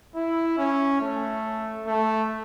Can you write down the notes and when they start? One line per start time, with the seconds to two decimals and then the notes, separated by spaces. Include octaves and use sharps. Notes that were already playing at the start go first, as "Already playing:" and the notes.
0.15 E4
0.58 C#4
1.01 A3
1.87 A3